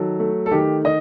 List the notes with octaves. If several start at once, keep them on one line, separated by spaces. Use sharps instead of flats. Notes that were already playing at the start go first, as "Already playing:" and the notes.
Already playing: D#3 F#3 A4
A3
A4
D#3 G4
D#3 D#5